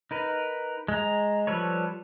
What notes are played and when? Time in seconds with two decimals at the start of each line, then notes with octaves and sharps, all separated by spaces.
0.11 D#4 A#4 B4
0.88 G#3 A#5
1.47 F3 G3 A4 B4 C#5